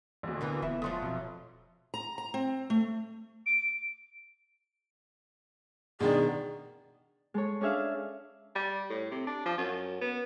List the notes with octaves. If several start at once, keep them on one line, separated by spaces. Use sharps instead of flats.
A1 D2 D3
E3 A#3 B3
E1 B3 E4
F3 F#3 A3 C6 D#6
F2 B2
A#5
A#5
C4
A3
D7
B2 D#3 D4 G#4
G#3 A4 C#5
C#4 D4 G#4 E5 F5
G3
A2
C3
D4
F3
F#2
B3